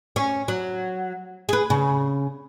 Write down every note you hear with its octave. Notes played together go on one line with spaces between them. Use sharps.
C#4
F#3
G#4 B4
C#3